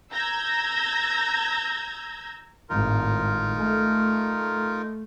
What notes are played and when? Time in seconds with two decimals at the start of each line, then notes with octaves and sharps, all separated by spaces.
0.12 A#5 E6 G6 G#6 A#6
2.70 G#1 A2 D#4 F4 A#4
3.57 A3